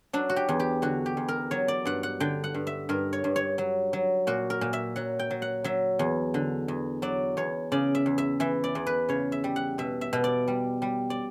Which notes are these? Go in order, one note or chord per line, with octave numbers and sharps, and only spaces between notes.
F#3 D4
F#4
G4
E2
G4
D3 F#4
G4
E2
A#4
F#3 C#5
D5
G2 F#5
F#5
D3 G5
F#5
G2
E5
G2 A#4
C#5
G2
C#5
F#3
F#3
A#2 F#4
A#4
A#2
E5
F#3 F#5
G5
F#3
F#5
F#3 E5
E2
D3
E2
F#3 D5
E2 C#5
C#3 D5
E5
E2
E5
E3 E5
D5
E2
B4
C#3 C#5
E5
G3
F#5
B2 E5
E5
B2
D5
G3
G3
D5